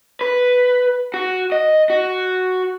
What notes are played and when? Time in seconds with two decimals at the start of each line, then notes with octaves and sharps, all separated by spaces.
0.21 B4
1.14 F#4
1.52 D#5
1.90 F#4